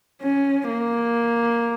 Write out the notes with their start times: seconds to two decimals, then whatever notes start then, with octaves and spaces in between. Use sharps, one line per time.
0.22 C#4
0.70 A#3